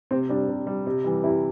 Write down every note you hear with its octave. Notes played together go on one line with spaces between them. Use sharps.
C3 C4
G3 D4
C3
G3
C3
E3 G3
C3 E4